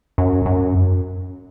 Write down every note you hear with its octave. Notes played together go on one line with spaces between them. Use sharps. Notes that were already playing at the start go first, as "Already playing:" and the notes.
F#2
F#2